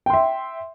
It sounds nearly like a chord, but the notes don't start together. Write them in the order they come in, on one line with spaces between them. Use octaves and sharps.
G5 C6 E5